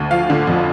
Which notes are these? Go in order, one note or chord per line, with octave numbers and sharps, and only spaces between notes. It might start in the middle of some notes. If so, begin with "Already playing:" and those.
Already playing: D2
F3 F5
D3
F2